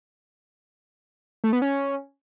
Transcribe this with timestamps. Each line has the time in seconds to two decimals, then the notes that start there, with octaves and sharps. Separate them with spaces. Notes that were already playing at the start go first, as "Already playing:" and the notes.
1.44 A3
1.53 B3
1.62 C#4